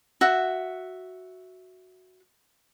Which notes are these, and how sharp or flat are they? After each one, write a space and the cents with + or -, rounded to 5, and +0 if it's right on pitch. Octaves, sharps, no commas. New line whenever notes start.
F#4 +0 E5 +0